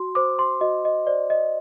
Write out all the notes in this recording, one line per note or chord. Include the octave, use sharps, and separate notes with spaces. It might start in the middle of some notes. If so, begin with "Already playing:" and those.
Already playing: F#4 C6
C5 D6
C6
F#4 D#5
D#5
C5 D5
D#5